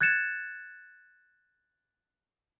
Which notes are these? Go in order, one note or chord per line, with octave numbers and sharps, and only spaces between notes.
F#6 G#6 A6 C#7 E7